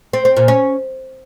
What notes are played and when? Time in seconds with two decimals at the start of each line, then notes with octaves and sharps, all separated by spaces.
0.13 C4
0.25 C4
0.37 A#2
0.48 C#4